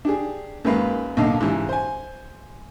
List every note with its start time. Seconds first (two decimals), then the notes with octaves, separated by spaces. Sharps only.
0.05 D4 G4 G#4
0.65 F#2 A#2 D#3 G#3 B4 F5
1.17 B1 A#2 D3 D#5 F5
1.40 G#2 C#3 E3 G3
1.69 C5 G#5